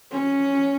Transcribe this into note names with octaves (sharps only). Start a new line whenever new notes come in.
C#4